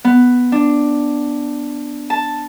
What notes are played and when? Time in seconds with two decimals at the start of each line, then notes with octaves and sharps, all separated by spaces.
0.05 B3
0.52 D4
2.10 A5